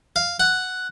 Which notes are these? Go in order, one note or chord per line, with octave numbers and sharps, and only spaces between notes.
F5
F#5